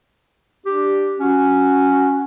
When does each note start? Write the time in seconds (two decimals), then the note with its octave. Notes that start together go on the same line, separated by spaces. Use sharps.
0.66 D4 G4
1.20 C#4 F#4